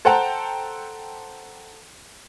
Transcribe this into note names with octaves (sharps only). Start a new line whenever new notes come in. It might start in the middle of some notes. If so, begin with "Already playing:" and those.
A4 C5 F#5 G5 A5 A#5